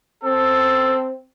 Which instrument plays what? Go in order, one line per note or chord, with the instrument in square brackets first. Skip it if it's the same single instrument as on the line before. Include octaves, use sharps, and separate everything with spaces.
[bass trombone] C4 [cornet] A4